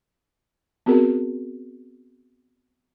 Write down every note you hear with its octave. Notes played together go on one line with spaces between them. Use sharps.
B3 C4 F#4 G#4 A#4